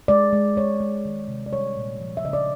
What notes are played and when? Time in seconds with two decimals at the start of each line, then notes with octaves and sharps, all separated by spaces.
0.08 G#3 D5
0.33 G#3
0.56 G#3 C#5
0.80 G#3
1.05 D#3
1.28 C3
1.46 D5
1.52 G3 C#5
1.77 A#2
2.01 F3
2.17 E5
2.24 C#3 D#5
2.33 D5